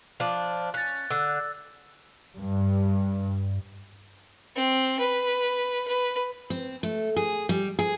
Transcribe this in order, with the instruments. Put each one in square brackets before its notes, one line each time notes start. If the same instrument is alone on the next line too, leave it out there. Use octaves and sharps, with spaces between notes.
[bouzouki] F3 D4
[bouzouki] C#4 [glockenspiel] F#6 A6
[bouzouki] D3 [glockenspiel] E6
[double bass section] G2
[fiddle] C4
B4
B4
[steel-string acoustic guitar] C4
A3
G#4
G3
G#4